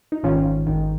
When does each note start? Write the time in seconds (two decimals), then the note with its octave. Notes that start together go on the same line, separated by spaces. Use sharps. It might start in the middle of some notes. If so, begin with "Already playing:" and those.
0.12 D#4
0.23 G#1 G#2 D#3 C#4 F4
0.67 G#1 G#2 D#3